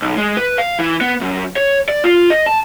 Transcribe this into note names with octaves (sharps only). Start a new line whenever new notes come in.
B1
G#3
B4
F5
E3
B3
F#2
C#5
D5
F4
D#5
A5